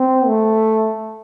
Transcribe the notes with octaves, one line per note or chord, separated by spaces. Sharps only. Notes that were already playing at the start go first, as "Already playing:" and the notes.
Already playing: C4
A3